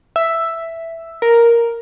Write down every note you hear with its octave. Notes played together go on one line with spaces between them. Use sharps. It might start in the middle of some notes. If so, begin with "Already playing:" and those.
E5
A#4